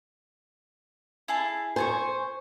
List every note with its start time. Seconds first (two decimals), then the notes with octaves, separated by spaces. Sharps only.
1.28 E4 G#4 A5
1.76 C5 G#5 A5 C#6